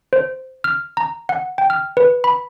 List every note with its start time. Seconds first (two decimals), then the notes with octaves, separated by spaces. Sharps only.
0.13 C5
0.64 F6
0.97 A#5
1.29 F#5
1.58 G5
1.70 F6
1.97 B4
2.24 B5